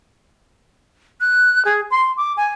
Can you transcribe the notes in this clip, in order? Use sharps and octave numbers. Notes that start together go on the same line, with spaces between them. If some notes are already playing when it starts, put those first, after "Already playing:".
F#6
G#4
C6
D6
G#5